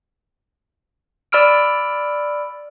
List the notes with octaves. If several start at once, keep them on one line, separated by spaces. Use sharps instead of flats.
D5 B5 E6 F6 D7